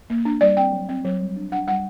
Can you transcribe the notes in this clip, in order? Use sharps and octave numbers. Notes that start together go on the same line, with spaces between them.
A#3
D4
G3 D5
C4 G5
F#3
C4
F#3
G3
D4
D4 F#5
G3 F#5